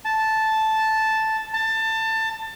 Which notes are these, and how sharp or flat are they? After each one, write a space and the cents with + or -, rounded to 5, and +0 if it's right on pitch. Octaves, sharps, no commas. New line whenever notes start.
A5 -5
A5 +20